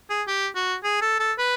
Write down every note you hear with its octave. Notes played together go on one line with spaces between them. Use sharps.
G#4
G4
F#4
G#4
A4
A4
B4